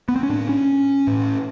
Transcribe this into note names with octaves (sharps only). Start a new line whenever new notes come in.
B3
C4
C#4
A2 D4
C#4
A2